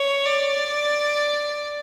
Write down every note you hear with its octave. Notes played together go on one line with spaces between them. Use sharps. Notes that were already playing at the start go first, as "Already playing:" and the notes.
Already playing: C#5
D5